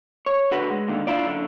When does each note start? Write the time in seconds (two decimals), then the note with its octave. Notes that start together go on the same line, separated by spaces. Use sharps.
0.26 C#5
0.51 D3 F#4 B4
0.70 G#3
0.88 D#2 D3
1.07 D4 E4 F4 D5
1.26 F#2 D3